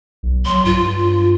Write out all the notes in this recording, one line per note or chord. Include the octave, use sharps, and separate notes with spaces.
B1
F#3 C6
G2 F4